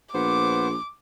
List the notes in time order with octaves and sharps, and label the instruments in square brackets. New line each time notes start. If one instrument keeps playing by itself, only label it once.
[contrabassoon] A#1 [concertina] B3 C5 [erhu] D6